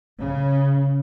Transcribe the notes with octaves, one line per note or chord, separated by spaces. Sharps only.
C#3